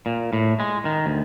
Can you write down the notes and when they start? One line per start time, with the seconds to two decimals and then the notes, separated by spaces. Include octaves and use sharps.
0.06 A#2
0.33 A2
0.60 G#3
0.85 D#3
1.06 D2